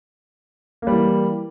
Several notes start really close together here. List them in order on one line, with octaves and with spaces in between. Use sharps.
A#3 G3 E3